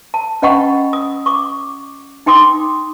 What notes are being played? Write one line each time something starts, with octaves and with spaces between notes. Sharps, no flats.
A5
C#4 D#5 F#5 G5 B5 C#6
D#6
C#6 D6
D#4 G5 C6 D6 D#6